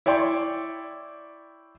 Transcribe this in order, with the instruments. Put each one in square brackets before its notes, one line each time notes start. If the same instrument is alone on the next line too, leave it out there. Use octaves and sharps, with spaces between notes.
[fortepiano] E4 C#5 D5 G5 C6